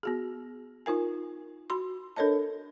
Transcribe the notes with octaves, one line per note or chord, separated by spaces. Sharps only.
B3 F#4 G#4
D#4 F4 A#4 G#5
F#4 B5 C6
D4 A4 A#4 C#5 D#5 A5